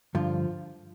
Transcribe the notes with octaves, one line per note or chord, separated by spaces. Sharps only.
G2 D3 F3 F4